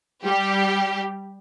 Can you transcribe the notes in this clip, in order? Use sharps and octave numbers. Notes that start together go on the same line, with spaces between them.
G3 G4